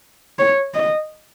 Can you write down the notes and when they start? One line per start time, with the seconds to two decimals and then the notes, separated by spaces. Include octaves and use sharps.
0.39 C#5
0.74 D#5